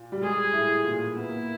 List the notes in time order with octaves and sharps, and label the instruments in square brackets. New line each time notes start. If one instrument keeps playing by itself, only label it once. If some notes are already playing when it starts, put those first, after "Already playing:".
Already playing: [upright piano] A#2
G3
[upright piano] G#3 [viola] G#4
[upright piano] A2 A3
A#2 A#3
[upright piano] B3 [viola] E4
[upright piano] A#3